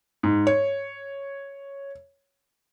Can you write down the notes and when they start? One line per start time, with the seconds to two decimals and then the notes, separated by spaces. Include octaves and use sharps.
0.23 G#2
0.47 C#5